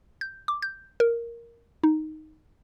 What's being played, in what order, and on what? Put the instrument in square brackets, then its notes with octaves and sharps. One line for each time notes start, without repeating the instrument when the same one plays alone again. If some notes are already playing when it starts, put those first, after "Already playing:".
[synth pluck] G6
D6
G6
A#4
D#4